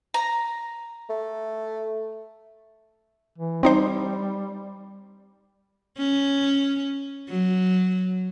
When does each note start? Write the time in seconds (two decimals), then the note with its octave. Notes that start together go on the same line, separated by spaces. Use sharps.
0.14 A#5
1.10 A3
3.39 E3
3.63 G3 C4 D#4 C5
5.98 C#4
7.30 F#3